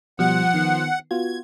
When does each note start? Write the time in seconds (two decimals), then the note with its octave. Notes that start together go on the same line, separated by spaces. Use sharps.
0.19 B2 F3 G3 F#5
0.54 D#3 B3 C7
1.11 B3 F4 F#4 G#6